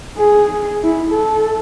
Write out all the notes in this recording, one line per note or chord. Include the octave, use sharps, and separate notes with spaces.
G#4
E4
A4